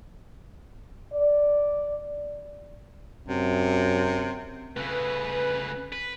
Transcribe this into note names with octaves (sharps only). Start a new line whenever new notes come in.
D5
F#2 C3
C#3 A3 B4
B4